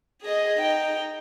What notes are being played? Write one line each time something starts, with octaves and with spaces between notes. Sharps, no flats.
G#4 D#5
D#4 G5